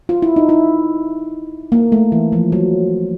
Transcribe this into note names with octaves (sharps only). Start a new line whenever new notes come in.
F4
E4
D#4
E4
A#3
A3
E3
F3
F#3